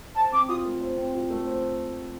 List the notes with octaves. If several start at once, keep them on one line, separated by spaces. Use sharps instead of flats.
C5 A5
C4 D6
F4 D#6
A3
C5
C4
F4
A3
C5